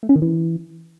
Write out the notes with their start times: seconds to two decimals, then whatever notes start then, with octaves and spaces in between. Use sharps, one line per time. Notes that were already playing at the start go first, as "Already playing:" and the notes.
0.03 A3
0.09 C#4
0.16 D#3
0.22 E3